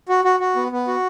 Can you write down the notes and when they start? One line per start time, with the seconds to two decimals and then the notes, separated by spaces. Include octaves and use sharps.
0.09 F#4
0.25 F#4
0.40 F#4
0.56 B3
0.72 B3
0.88 F#4